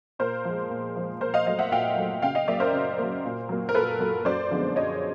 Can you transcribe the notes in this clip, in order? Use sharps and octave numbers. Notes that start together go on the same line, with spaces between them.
A#2 A#4 C5
F3 G#3
A#2
F3 G#3
A#2 A#4 C5
D#5 F5
F#3 A3 D#5 F5
E5 F#5
A#2 F5 G5
F#3 A3
C#3 F5 G5
D#5 F5
F#3 A#3 D5 E5
A#4 C5
C#3
F#3 A#3
A#2
F#3 A#3
A#4
A#2 A4 B4
F#3 A#3
F#2 C5 D5
D3 F3 G#3 B3
F#2 C#5 D#5